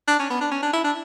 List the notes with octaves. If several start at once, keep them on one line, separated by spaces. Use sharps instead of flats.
D4
C#4
B3
D4
C#4
D4
E4
D4